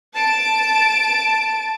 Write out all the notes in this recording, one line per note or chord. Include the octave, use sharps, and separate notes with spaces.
A5 D7